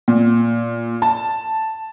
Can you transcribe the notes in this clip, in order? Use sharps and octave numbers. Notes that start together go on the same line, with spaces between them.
A#2
A5